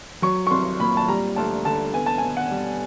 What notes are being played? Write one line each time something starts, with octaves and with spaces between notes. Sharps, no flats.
F#3 C#6
C#6
C2 C6
A#2 B5
A5
G3 A#5
D2 A5
D3 A5
B3 G#5
A5
B2 G#5
F#5
G3